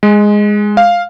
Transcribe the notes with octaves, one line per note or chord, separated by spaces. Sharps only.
G#3
F5